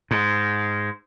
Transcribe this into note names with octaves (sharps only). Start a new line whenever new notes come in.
G#2